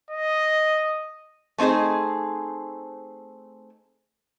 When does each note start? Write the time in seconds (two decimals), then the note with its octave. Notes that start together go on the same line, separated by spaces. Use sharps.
0.11 D#5
1.58 A3 C4 D#4 G#4 C5